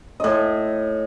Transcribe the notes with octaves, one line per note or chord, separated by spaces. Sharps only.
A2 D#5